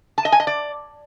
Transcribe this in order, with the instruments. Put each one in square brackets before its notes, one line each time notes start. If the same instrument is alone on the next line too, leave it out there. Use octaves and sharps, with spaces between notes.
[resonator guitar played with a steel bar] A5
D#5
G#5
D#5
D5